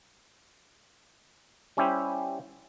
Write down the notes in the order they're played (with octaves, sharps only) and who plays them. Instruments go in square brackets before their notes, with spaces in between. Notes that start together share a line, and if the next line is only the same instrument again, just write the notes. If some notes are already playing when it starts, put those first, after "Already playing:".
[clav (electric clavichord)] G3 C#4 E4 G4 C5